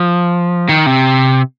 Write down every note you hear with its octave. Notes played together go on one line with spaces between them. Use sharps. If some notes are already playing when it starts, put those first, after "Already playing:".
Already playing: F3
D#3
C3